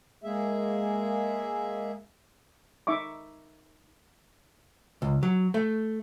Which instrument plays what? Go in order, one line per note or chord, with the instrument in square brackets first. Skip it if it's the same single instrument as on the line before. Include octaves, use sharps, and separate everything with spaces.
[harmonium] G#3 A#3 G#4 E5
[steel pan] D#4 E5 C#6 D6
[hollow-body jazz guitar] C#2
F#3
A3